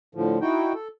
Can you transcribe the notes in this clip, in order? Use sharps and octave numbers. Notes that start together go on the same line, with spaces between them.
A2 D3 F3
D#4 E4 F#4 G5
A4